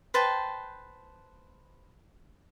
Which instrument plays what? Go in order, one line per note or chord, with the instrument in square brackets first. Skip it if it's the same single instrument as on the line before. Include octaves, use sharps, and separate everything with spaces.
[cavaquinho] B4 C5 G5 A5